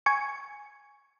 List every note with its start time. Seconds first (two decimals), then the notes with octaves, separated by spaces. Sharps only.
0.06 G#5 C#6